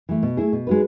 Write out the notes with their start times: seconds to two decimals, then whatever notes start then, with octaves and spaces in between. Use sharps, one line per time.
0.09 E3 A3
0.23 B2
0.37 A3 E4 G#4
0.53 B2
0.67 G#3 D#4 F#4 B4